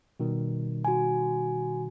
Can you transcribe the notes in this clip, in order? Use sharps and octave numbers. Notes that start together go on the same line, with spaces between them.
B2 D#3 G3
F#4 G#5